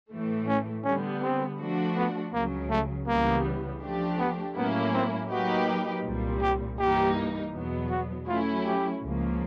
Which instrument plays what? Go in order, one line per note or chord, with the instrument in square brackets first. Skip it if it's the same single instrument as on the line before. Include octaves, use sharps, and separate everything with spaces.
[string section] A2 E3 A3
[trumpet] C#4
[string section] D3 G3 B3 [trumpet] C#4
[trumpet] C4
[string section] F3 A3 D4 F#4
[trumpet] B3
[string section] C#2 C#3 F#3 [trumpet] A#3
[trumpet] A3
[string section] C#2 C#3 E3 G3 B3 [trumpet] A#3
[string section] F3 A3 D4 G4
[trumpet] B3
[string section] A2 F#3 A#3 C#4 E4 [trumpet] B3
[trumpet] C4
[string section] F#3 A#3 D#4 G4 B4 [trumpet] F#4
[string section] C2 A#2 G3
[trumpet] G4
[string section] G2 E3 G3 A#3 D#4 [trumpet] G4
[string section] E2 B2 F#3 B3
[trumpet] F#4
[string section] F#3 A3 C#4 E4 [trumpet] F4
[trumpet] G4
[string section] C#2 C#3 F3 A#3